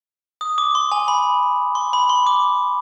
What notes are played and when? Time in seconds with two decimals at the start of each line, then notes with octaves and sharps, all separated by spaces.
0.41 D#6
0.58 D6
0.75 C6
0.92 G#5
1.08 B5
1.75 C6
1.93 B5
2.09 C6
2.27 D6